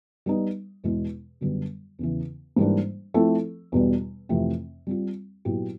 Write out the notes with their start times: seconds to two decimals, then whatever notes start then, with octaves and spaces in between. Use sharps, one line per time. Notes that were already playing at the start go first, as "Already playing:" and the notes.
0.26 G3 B3 D#4
0.84 E2 B2 G#3 B3 E4
1.41 F#2 D3 G3 B3
1.99 E2 C#3 E3
2.56 G#2 E3 G3 A#3 D4
3.14 F3 A3 C4 E4 A4
3.72 E2 B2 G3
4.29 F2 C3 E3 A3 C4
4.87 G3 C4 F4
5.45 A#2 F#3 B3 E4 G4